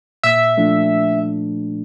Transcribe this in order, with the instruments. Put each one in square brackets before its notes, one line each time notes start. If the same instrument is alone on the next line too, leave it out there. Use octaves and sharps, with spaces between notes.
[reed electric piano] A#2 [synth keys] E5
[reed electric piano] F3 A3 D4